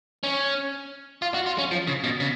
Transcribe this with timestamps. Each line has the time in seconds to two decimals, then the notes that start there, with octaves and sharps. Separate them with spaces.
0.23 C#4
1.22 F4
1.34 F#4
1.46 F4
1.58 C#4
1.72 F3
1.87 C#3
2.04 B2
2.20 C#3